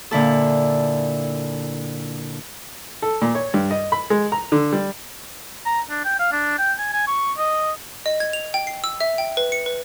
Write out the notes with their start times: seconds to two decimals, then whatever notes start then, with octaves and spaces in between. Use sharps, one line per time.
0.11 A#2 D3 E4 A4
3.02 A4
3.22 A#2
3.35 C#5
3.54 G2
3.71 D#5
3.92 B5
4.10 G#3
4.32 A#5
4.52 D3
4.73 G3
5.66 A#5
5.90 D4
6.05 G5
6.19 F5
6.32 D4
6.58 G5
6.79 G#5
6.93 G#5
7.07 C#6
7.38 D#5
8.06 D#5
8.20 G#6
8.33 F7
8.54 G5
8.67 C7
8.84 E6
9.01 E5
9.18 G5
9.37 B4
9.52 C#7
9.66 B4